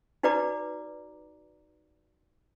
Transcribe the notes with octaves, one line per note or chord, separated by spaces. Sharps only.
D#4 F#4 B4 D5 A#5 D6